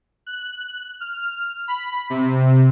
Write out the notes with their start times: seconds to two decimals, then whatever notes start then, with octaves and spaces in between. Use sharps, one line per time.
0.27 F#6
1.01 F6
1.68 B5
2.10 C3